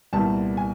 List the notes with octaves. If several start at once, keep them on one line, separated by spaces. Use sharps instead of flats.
C2 A#2 G3 B3 A5
G#5